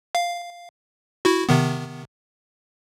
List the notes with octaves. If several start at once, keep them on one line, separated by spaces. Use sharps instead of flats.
F5
E4 F#4
C3 D#3 B3